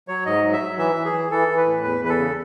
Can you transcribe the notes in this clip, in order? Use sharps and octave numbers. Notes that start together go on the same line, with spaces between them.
F#3 C#5
G#2 D#5
F#3
E5
F#3
E3 E5
E3
G#4
E3
E3 A4
E3
B4
A2
E2 B4
E2 B4
A4
C#3